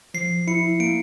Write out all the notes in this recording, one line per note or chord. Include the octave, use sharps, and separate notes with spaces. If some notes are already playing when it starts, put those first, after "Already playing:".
F3 C7
E4 C#7
A#3 D7